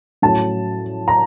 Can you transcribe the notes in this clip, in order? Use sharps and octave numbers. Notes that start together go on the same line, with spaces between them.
A2 F#3 A3 C#4 A5
A#5